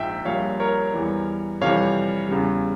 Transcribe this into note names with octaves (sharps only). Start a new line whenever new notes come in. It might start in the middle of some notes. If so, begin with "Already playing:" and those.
Already playing: A#1 G#2 F3 E5 G5
A#1 A#2 G3 C#5 F5
A#4 C#5
E2 E3 G3
F2 C3 E3 G3 C#5 F5
E2 C#3 G3